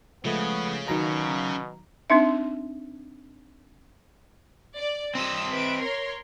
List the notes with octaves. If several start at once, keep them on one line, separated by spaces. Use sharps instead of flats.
C#3 F3 G#3 A3 B3
B2 D#3 F#3 A#5
C4 D4 D#4 E5
D5
C4 D#5 E6
B4 E5 D7
A#4 C#5 C6